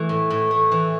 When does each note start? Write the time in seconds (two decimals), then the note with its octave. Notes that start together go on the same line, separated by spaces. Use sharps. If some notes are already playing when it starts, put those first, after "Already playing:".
Already playing: E3 A3
0.09 A2
0.30 A2
0.51 A3
0.72 E3